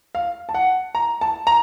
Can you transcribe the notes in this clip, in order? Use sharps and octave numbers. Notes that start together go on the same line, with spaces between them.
F5
A5
F#5
A#5
A5
A#5